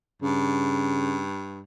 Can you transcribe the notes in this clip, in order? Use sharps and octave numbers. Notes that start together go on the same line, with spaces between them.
G2 C#3